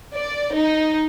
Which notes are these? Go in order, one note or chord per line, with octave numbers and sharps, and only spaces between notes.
D5
D#4